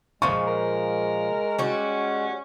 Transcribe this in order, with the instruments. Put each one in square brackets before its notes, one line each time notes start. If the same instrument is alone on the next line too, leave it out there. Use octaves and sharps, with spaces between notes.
[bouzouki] A#2 F3 [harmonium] G#3 [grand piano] C#6
[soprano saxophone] A#4
[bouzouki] G3 F#4 [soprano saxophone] C#4